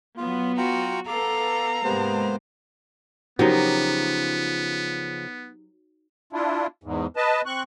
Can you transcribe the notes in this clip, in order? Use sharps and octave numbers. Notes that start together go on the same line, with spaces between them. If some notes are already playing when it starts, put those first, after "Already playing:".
F#3 B3 F4
F4 F#4 G5 A#5
B3 A4 F5 A#5 D6
G#2 C3 G#3 A#3 B3 C5
C#3 F3 F#3 B3 D#4 G4 A#4 C5
D4 E4 F4
E2 G#2
B4 D#5 A5
C4 C#6 F#6